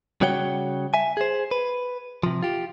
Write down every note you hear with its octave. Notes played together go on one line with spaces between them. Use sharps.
C#3 G3 F#4 C#5 F#5 G5
E5 G#5
G#4 C5
B4
C3 F3
F4 G4